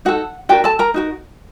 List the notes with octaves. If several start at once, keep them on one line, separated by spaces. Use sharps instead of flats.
D#4 F#4 A4 F#5
D4 F#4 G4 A#4 G5
A4 A5
A#4 A#5
D#4 F#4 A#4